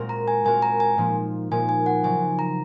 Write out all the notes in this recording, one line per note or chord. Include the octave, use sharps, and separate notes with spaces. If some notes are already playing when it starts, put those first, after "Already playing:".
Already playing: A#2 G#3 C4 F#4 A#4
A#5
G#5
A#2 G#3 C4 F#4 A#4 G#5
A#5
G#5
A#2 F3 A#3 D#4
A#2 F3 A#3 D#4 G#5
G#5
F#5
C#3 F#3 C4 D#4 G#5
A#5